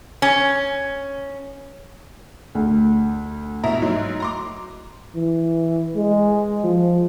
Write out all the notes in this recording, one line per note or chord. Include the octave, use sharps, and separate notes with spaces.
C#4
D2
B2 E4 A#5
G#2 F#3
A#5 C6 D6
E3
G#3
F3